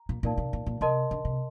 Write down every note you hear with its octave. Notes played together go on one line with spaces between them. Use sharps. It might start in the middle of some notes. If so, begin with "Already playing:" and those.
Already playing: A#5
A#2
A#2 D#4 A#4 D5 F5 A5
C3
A#2
A#2
C3 A#4 D#5 A5 C6
D3
C3